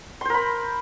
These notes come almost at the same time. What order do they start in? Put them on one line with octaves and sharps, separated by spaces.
C6 C5 A#4 B5